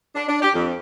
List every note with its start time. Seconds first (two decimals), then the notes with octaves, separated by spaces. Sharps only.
0.15 D4
0.27 D4
0.42 G4
0.54 F2